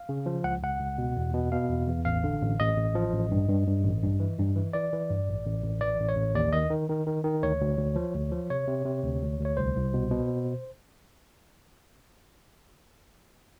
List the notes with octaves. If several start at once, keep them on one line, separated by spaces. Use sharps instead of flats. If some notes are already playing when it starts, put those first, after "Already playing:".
Already playing: F5
C#3
F3
C#2 F#5
C#2 F#5
C#2
B2
E2
B2
B2 F5
E2
E2
A1 F5
D3
A1
A1 D#5
A1
F3
A1
G2
G2
G2
A1
G2
E3
G2
E3
E3 D5
E3
G2
A1
A1
A1
E3 D5
A1
C#5
A1
D#2 D5
D#3 D#5
D#3
D#3
D#3
D#3
D2 C#5
D2
D2
F3
D2
F3
C3 C#5
C3
C3
D2
D2
D2
C#5
C2 C5
C2
B2
B2